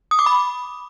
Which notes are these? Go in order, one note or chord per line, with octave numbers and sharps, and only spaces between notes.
D#6
D6
B5